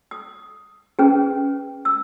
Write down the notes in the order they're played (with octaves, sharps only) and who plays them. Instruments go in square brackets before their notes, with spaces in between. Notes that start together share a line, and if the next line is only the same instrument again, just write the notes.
[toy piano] D#6
C#4 G#4 B4
E6